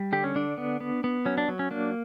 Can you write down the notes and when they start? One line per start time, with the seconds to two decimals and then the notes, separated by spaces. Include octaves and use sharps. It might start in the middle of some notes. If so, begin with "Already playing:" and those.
Already playing: G3
0.12 D3 G4
0.24 C#4
0.35 D3 D4
0.58 B3
0.80 B3
1.04 B3
1.25 F#3 C#4
1.38 D4
1.48 F#3
1.59 C#4
1.71 A#3 D4